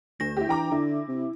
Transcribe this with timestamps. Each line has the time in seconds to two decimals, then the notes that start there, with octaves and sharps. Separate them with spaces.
0.20 D2 D4 A#6
0.37 E4 G4
0.49 E3 G5 A#5 D6
0.72 D3 E4
1.08 C3